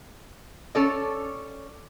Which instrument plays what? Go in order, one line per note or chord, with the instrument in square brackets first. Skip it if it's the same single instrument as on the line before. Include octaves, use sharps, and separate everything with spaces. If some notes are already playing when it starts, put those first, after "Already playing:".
[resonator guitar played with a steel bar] C#4 A4 D5